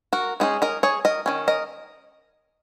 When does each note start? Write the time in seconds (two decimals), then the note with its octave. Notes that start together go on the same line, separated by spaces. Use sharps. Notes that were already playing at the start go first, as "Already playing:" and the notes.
0.13 F#4 A#4
0.40 G#3 C#4 D#4 G#4
0.62 A#4 D#5
0.83 G#4 C#5
1.05 A#4 D#5
1.26 D#3 G#3 C#4
1.48 A#4 D#5